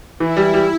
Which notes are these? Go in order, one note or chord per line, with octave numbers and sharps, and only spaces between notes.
E3 E4
G3
G3